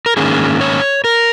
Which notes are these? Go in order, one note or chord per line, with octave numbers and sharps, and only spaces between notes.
A#4
G#2 D#3 A#3 C#4 G#4
C#5
A#4